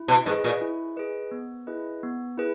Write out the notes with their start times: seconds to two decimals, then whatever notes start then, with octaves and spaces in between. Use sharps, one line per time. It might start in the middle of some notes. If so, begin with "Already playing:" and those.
Already playing: E4
0.08 B2
0.26 G#2 G#4 B4 D#5
0.44 A#2
0.61 E4
0.96 G#4 B4 D#5
1.31 B3
1.67 E4 G#4 B4 D#5
2.03 B3
2.38 E4 G#4 B4